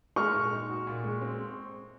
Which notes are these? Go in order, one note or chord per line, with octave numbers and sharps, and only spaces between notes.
G#3 C#6 F6
A#2
D#4
F#4
A#2
G#3
C4